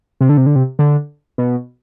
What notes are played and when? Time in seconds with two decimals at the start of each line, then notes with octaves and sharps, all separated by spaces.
0.21 C3
0.29 D3
0.37 C3
0.46 D3
0.56 C3
0.79 D3
1.38 B2